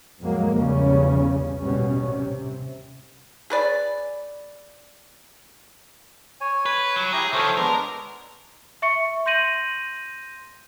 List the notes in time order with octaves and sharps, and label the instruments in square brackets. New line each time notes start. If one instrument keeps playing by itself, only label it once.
[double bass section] F2 A2 F#3 G#3 A#3
A#1 E2 C#3 G3 C#4
A1 D#2 B2 G3 C#4
C3
[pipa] G#4 B4 D5
[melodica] C#5 G#5
[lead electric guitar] B4
F#3
[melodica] E4 G4 A#5 [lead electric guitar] G#4
[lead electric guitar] D#3 F3 [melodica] A4 C5 C#5
[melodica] G#3 B3 D4 [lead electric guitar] A#4
[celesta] E5 C#6 C#7
C6 G6 A#6 D#7 F#7